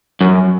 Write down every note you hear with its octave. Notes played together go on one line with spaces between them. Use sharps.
F#2